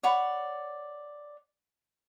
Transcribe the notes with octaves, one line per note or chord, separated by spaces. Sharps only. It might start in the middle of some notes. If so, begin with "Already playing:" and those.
C#5 D5 F#5 B5